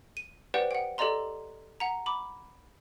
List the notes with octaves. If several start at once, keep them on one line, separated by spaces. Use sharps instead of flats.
D#7
G4 B4 C5 D5 F#5 G5
F#5 G5
G4 A4 D5 D#5 A#5 C6
F#5 A#5
B5 D6